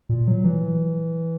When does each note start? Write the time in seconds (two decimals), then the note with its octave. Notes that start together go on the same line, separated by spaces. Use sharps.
0.09 A#2
0.28 F#3
0.44 E3